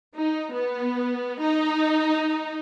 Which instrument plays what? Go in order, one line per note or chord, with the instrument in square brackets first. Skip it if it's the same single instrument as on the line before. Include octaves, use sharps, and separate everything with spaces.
[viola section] D#4
B3
D#4